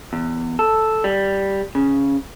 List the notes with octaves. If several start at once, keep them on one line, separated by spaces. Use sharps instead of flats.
E2
A4
G3
C#3